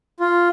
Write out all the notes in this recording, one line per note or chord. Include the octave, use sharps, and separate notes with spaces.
F4